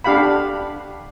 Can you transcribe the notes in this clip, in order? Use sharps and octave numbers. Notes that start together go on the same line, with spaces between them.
D4 G4 F5 F#5 B5